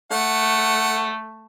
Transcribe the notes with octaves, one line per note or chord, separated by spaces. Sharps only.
A3 F#5